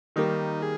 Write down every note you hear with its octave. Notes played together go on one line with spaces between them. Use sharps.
D#3 G3 A#3 D#4
G#4